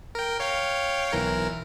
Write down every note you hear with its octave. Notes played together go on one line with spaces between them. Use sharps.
A#4 G5
C#5 F5 G5
B1 E3 A#4